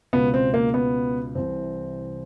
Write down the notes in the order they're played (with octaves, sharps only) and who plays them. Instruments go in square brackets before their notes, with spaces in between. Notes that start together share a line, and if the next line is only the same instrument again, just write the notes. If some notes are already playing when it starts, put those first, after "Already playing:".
[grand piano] C#2 B2 B3
C4
A#3
B3
C2 C3 E3 C4